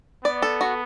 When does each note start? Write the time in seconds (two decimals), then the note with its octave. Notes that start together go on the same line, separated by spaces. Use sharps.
0.25 B3 D5
0.42 A4
0.61 F#4